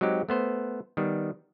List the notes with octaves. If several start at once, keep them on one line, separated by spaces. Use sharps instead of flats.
F#3 G#3 C4 D#4 G4
A3 B3 C5
D#3 G3 B3